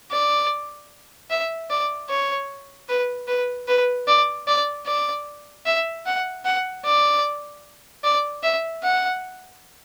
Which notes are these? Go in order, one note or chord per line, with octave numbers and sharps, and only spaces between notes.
D5
E5
D5
C#5
B4
B4
B4
D5
D5
D5
E5
F#5
F#5
D5
D5
E5
F#5